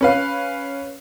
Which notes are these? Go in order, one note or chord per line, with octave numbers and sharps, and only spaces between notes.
C#4 B4 F5